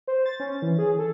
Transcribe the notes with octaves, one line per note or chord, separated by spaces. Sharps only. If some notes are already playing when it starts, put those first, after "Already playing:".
C5
A6
C#4
E3
G#4
A4